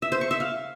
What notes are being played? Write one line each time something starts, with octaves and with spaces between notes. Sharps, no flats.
E5
C5
C#6
E5
F5